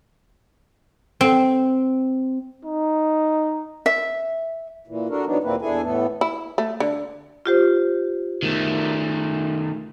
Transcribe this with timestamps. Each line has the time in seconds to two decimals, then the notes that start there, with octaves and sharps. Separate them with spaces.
1.21 C4
2.65 D#4
3.86 E5
4.87 A#2 E3
5.09 D4 F#4 A4 A#4
5.25 D3 E3 F#3 B3 D4 D#4
5.44 D#2 A#2 A#3 C4 E4 B4
5.62 E2 D4 E4 G#4 A4 G#5
5.83 A2 E3 A3 B3 A4
6.21 E4
6.58 A3
6.80 D3
7.46 F4 G4 C5
8.43 D#3 A3